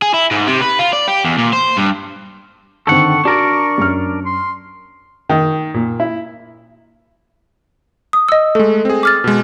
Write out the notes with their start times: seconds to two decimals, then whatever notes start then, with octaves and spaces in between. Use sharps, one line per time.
0.02 G#4
0.14 E4
0.31 G#2
0.48 C3
0.61 B4
0.79 F4
0.93 D5
1.08 G4
1.24 E2
1.38 A#2
1.53 C5
1.77 G2
2.87 D3 D#3 C4 A4 F#5 C#6
3.25 D4 F#4 A#4 D5
3.78 F#2 F6
4.26 C6
5.30 D#3
5.74 A#2
6.00 E4
8.13 D#6
8.28 D#5 E6
8.55 G#3 A3 A4
8.85 C4 G#4
9.03 D6 F6 A6
9.24 B2 G#3